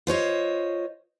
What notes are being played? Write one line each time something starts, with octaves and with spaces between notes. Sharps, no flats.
F4 C5 C#5 D#5